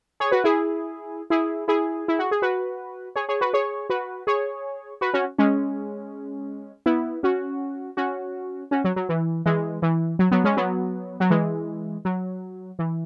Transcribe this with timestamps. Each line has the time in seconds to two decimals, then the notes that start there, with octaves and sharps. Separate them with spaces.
0.20 G#4 C#5
0.32 F#4 B4
0.44 E4 G#4
1.30 E4 G#4
1.68 E4 G#4
2.08 E4
2.19 F#4
2.31 G#4
2.42 F#4 B4
3.16 G#4 C#5
3.29 G#4 C#5
3.41 F#4 B4
3.53 G#4 C#5
3.90 F#4 B4
4.27 G#4 C#5
5.01 F#4 B4
5.14 C#4 F#4
5.39 G#3 C#4
6.86 B3 E4
7.23 C#4 F#4
7.97 C#4 F#4
8.71 C#4 F#4
8.84 F#3
8.96 F#3
9.09 E3
9.46 E3 G#3
9.82 E3
10.19 F#3
10.31 F#3 B3
10.44 G#3 C#4
10.57 F#3 B3
11.20 F#3
11.30 E3 G#3
12.05 F#3
12.79 E3